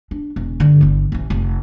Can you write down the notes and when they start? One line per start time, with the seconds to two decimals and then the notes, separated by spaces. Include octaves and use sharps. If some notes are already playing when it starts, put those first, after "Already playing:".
0.11 D4
0.36 E1
0.60 G2 D3
0.81 G1 E3
1.12 A1 E3
1.30 F1